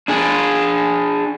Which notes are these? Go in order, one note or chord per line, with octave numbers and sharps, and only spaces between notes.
D4 G#4